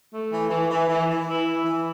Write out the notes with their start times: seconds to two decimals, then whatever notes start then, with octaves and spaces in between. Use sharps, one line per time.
0.11 A3
0.31 E3
0.49 E3
0.69 E3
0.88 E3
1.08 E3
1.27 E4
1.46 E3
1.65 E3